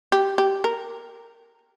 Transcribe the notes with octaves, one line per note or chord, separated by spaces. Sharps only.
G4
G4
A#4